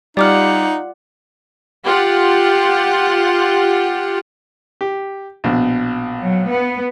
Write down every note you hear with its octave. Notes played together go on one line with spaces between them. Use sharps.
G3 D#4 F4 G4 D5 F#5 D6 F6
F4 G4 F#5
G4
A#1 B2
F#3
B3